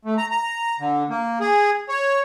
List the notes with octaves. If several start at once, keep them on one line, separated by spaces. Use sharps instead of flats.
A3
A#5
A#5
D3
A#3
G#4
C#5